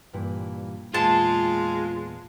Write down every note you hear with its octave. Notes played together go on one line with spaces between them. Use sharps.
G2 A#2 E3
E2 A#2 G#3 F4 A5